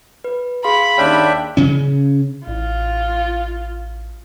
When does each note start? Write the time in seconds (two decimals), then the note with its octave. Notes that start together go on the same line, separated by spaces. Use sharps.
0.24 B4
0.64 G#4 F5 B5 C6
0.98 D#2 C#4 D4 E5 G5
1.57 C#3 C#4
2.47 A1 F4